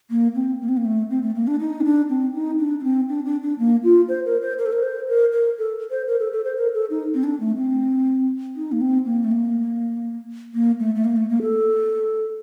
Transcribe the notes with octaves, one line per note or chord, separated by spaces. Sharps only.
A#3
C4
A#3
C4
A#3
A3
C4
A3
A#3
D4
D#4
C4
D4
C4
D#4
D4
D4
C4
D4
D4
D4
A#3
F4
C5
A#4
C5
A#4
A4
A#4
C5
A#4
A#4
A4
C5
A#4
A4
A4
C5
A#4
A4
D#4
C4
D4
A3
C4
D#4
A#3
C4
A#3
A3
A#3
A#3
A3
A3
A#3
A3
A#3
A4